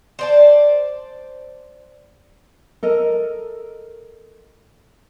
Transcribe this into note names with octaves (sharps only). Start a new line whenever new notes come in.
C5 D5 A5
A4 A#4 D#5